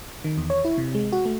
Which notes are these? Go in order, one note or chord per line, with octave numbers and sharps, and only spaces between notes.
D#3
E2
C#5
E4
C3
G#3
F#4
A3